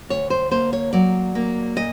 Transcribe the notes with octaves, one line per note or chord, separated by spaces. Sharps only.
D2 C#5
C5
A#3 C5
C#5
F#3 D5
A#3
A#2 D#5